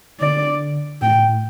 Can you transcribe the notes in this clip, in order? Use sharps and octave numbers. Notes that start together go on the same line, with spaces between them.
D3 D5
A2 G5
A2
A2